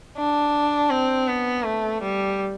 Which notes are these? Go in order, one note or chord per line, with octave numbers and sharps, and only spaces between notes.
D4
C4
B3
A3
G3